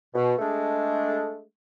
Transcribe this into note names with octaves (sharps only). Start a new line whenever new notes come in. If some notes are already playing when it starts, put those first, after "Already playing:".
B2
G#3 A3 D4